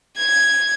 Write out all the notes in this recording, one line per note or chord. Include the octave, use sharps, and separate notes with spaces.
G#6